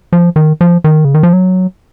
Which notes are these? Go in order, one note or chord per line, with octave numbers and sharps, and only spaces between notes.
F3
D#3
F3
D#3
C#3
D#3
F3
F#3